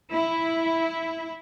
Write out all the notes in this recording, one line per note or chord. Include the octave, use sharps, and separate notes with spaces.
E4